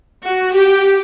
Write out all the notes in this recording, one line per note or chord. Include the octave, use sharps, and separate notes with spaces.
F#4
G4